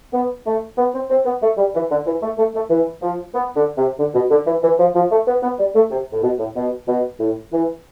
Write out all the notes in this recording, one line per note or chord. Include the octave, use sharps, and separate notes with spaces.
B3
A3
B3
C4
C4
B3
A3
G3
E3
D3
E3
A3
A3
A3
E3
F3
B3
D3
C3
D3
B2
D3
E3
E3
F3
F3
A3
B3
B3
G3
A3
C3
A2
B2
A2
B2
B2
A2
E3